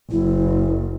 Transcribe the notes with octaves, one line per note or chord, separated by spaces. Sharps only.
F#1 E4